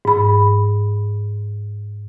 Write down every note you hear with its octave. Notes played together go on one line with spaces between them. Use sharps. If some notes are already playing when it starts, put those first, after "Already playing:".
G#2 B5